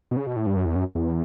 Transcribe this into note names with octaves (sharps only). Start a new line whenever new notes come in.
B2
C#3
B2
A2
G2
F#2
E2
F#2
E2